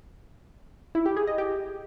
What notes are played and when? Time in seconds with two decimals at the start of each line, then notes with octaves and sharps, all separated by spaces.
0.95 E4
1.06 G4
1.17 G#4
1.27 D#5
1.38 G4